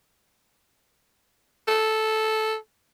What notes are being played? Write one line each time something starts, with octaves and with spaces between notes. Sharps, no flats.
A4